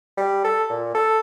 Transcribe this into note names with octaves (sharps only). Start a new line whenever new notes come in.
G3
A4
A#2
A4